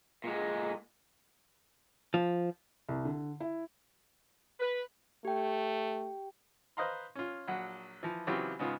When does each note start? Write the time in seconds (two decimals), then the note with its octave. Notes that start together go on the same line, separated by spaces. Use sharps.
0.24 A#2 G#3
2.14 F3
2.89 C2
3.05 D3
3.40 E4
4.59 B4
5.25 A3 G4 G5
6.77 B4 C5 D#5 F5 A#5 C6
7.15 C#4 F4
7.48 A#1 F#3 F#5
8.03 E3 F3
8.27 C#3 E3 F#3 C4 F4 G4
8.59 G#2 C#3 B3 F4